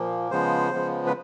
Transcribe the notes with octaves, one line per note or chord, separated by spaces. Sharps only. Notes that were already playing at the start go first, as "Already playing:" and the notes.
Already playing: A#2 F3 A#3
C#3 F3 G#3 B3 C5
C#3 F3 G#3 B3
B4